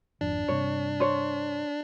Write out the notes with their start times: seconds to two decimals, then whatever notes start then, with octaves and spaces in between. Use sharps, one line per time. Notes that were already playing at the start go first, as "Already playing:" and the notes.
0.21 G#1 F2 F3 D4
0.48 G2 C3 C#5
1.00 C5 C#5